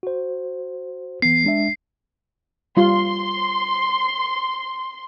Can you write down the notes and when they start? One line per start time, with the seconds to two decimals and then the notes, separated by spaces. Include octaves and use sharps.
0.03 F#4 C5
1.22 E3 B3 C7
1.44 G#3 D4 E5
2.77 G3 F4 C6